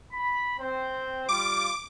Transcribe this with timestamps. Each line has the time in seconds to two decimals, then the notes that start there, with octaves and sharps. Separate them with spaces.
0.13 B5
0.60 C4 C5
1.29 G3 F4 D6